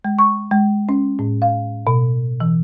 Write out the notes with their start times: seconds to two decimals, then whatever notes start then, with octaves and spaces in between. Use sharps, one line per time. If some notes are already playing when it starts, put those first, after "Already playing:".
0.05 G#3
0.19 C#6
0.51 G#3
0.89 C#4
1.19 A2
1.42 F5
1.87 B2
2.40 E3